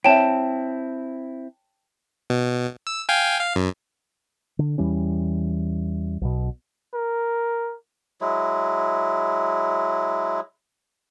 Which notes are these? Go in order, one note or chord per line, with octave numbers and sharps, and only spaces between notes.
C4 E4 C#5 E5 G5 A5
B2
E6
F5 G5 G#5
F5
F#2
D3
E2 E3 G3 C#4
B1 B2
A#4
F#3 G#3 E4